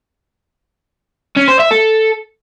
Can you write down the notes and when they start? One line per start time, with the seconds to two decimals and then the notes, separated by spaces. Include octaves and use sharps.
1.37 C#4
1.49 C5
1.60 E5
1.72 A4